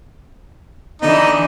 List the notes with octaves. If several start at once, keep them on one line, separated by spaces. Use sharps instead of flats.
D3 E3 D#4